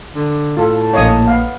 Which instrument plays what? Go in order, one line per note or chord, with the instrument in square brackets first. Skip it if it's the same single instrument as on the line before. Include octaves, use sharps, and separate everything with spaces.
[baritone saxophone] D3
[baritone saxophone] A2 [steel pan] F4 A4 [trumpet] A5
[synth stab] A#1 A#3 [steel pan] C#5 D#5 D#6
[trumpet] B3 [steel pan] F5